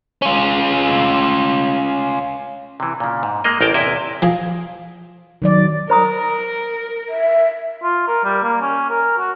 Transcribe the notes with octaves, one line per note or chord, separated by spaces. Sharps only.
C#4 F4
C3 E3
A#2 C#3
G#2
G#3 A#3 D#5
A1 A#4 G5 A5
E2 C3 E4 D#5 E5
F3 G#4
D#3 F#3 D5
A#4 C5 A#5 D#6
E5
F4
A#4
G3
A#3
C#4
A#4
F#4